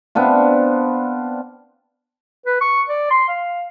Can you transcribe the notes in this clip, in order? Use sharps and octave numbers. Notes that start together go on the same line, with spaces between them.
B3 C4 D4 F4
B4
C#6
D5
C6
F5